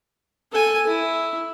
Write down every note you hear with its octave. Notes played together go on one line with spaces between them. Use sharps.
A4 G#5
E4